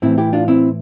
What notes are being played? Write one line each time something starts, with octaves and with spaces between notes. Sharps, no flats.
A2 E3 C4 E4
E4 G4
D4 F4
C4 E4